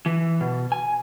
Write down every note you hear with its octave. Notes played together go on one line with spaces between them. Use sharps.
E3
B2
G#5